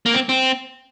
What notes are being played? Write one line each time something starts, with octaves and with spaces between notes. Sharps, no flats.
A#3
C4
C4